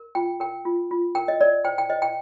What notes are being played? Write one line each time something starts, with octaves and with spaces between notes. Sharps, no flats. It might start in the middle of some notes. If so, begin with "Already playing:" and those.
Already playing: A#4
F4 G5
A#4 G5
F4
F4
A#4 G5
D#5
A#4 D5
C5 G5
G5
C5 D#5
G5